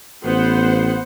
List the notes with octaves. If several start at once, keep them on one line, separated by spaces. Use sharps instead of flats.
A1 B3 C5 F#5